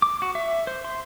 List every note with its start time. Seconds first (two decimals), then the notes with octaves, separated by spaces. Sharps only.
0.02 D6
0.22 F#4
0.35 E5
0.67 C5
0.85 C6